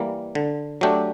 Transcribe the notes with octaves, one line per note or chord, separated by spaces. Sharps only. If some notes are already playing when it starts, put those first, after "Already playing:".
Already playing: E3 G3 A#3
D3
F#3 A3 D4 G4